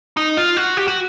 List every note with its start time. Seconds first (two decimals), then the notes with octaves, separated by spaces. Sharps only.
0.17 D#4
0.37 F4
0.57 F#4
0.77 G4
0.88 F#4